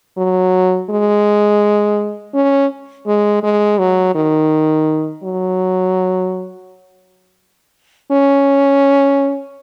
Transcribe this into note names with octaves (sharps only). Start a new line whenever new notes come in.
F#3
G#3
C#4
G#3
G#3
F#3
D#3
F#3
C#4